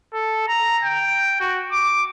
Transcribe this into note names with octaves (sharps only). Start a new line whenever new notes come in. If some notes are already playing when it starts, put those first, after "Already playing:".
A4
A#5
G5
F#4
D6